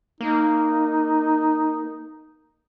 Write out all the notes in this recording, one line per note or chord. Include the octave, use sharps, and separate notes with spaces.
A#3 D#4